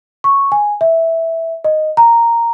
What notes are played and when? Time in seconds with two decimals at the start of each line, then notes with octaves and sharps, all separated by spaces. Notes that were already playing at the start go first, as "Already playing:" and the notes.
0.24 C#6
0.52 G#5
0.81 E5
1.64 D#5
1.97 A#5